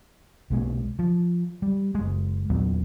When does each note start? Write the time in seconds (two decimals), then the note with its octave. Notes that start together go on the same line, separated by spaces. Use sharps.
0.50 B1 B2 G#3 A#3
0.99 F3
1.62 G3
1.95 F#1 G#3
2.50 E2 A#2 F#3 B3